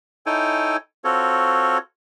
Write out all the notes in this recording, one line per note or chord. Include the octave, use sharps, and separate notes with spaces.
D#4 E4 A4 C#5 G5 G#5
C4 F4 F#4 A4 C#5